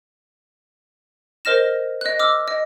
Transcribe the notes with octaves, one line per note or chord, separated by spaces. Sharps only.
A#4 C5 D#5 F6 A#6 E7
D#5 F#6
D6 E6 F6
D#5